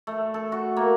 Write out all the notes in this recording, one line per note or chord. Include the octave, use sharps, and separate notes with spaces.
A3
A4
F#4
A#3